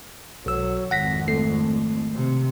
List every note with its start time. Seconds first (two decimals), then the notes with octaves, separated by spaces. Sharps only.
0.46 B1 F#3 E6
0.91 G#1 F2 F#5 A#6 B6
1.28 A3 C7
2.14 C3